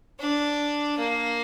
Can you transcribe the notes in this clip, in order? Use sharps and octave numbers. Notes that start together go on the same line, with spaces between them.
D4
A#3